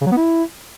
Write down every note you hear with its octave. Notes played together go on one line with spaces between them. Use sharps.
C#3
F#3
B3
E4